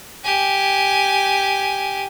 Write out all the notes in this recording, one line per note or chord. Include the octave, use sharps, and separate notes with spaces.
G4 G#5